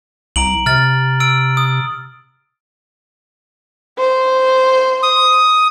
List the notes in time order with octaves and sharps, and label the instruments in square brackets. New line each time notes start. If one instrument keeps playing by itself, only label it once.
[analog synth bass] C2 [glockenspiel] A#5 D7 F#7
[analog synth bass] C3 [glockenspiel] F6 A6
[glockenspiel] E6 D7
D#6
[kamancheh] C5
[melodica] D#6